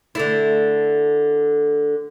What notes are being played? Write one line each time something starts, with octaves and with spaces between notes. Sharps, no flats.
D3 A3 E4